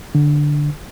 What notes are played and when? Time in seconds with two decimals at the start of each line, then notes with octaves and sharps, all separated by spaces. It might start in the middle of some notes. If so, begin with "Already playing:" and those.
0.15 D3